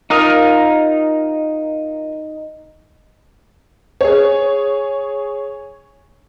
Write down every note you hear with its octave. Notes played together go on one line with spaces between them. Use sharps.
D#4 F4 A#4 D#6
G#4 C#5